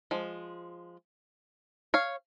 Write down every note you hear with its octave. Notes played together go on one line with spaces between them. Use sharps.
F3 G#3
C#5 F5